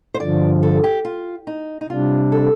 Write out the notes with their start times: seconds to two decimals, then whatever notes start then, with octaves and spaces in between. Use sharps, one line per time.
0.14 C5
0.20 G2 D3 F3 D5
0.63 A4
0.84 G4
1.05 F4
1.47 D#4
1.81 D#4
1.90 C3 G3 D4 F4
2.32 A4